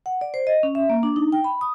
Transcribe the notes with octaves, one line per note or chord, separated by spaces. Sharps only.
F#5
D5
C5
D#5
C#4
E5
A#3
D4
D#4
G5
B5
D#6